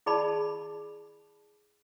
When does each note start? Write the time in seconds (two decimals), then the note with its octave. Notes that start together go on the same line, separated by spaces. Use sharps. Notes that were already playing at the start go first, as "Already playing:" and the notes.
0.06 E4 G#4 D5 A5 B5